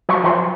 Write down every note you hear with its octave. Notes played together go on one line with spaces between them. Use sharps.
F#3
F3